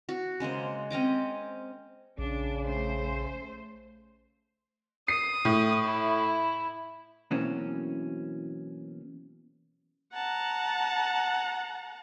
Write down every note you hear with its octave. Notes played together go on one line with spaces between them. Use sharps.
F#4
C#3 G#3 A#3 C5
C4 C#4 D#5 D6
A#1 C#3 D4
A3 C5
D#6 C7
A2
E4
B2 E3 F#3 A#3 C4 C#4
F#5 A5 A#5